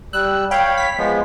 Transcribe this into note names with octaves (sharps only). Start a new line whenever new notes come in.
G3 E6 F#6
C#5 F5 G5 B5
B6
F3 G#3 B3